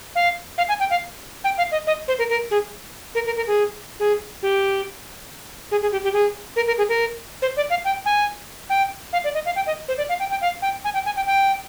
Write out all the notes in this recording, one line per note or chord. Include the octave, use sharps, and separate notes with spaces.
F5
F5
G#5
G5
F5
G5
F5
D#5
D#5
C5
A#4
A#4
G#4
A#4
A#4
A#4
G#4
G#4
G4
G#4
G#4
G4
G4
G#4
A#4
A#4
G#4
A#4
C5
D5
F5
G5
G#5
G5
F5
D5
D#5
F5
G5
D#5
C5
D5
F5
G5
G5
F5
G5
G#5
G5
G#5
G5
G5